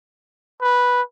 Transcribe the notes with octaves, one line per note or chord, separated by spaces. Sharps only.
B4